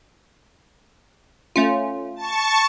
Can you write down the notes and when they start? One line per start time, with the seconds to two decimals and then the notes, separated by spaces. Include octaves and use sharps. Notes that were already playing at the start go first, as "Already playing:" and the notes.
1.56 A3 C#4 F4
2.16 A5 C#6